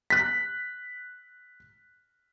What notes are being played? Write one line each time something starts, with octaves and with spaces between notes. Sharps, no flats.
F#6 B6